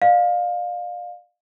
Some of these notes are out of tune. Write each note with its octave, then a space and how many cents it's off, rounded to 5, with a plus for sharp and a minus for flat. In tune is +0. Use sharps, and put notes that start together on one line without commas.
D5 +45 F5 +20